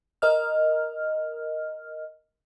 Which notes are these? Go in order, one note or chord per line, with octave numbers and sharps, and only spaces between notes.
A#4 D#5 F6